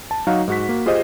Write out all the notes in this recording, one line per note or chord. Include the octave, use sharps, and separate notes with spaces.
A5
F#3 D#4 F#4 F5
G#2 F#4 B6
A#3 F#4
F4 G4 G#4 C5 D#5